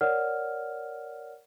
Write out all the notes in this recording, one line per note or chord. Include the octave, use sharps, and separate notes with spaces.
A#4 C#5 D5 F#5 F6